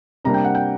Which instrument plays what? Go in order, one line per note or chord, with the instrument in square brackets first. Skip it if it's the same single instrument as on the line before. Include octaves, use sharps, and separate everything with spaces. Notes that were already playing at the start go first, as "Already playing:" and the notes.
[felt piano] C3 G3 A#3 D4 A#5
G5
F#5
G5